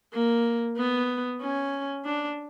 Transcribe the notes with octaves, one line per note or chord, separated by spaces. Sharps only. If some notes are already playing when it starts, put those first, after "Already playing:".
A#3
B3
C#4
D4